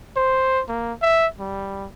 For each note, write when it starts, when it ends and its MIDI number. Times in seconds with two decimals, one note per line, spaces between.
0.16 0.62 72
0.68 0.93 58
1.02 1.27 76
1.40 1.88 55